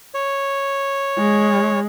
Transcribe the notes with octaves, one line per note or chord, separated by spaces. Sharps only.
C#5
G#3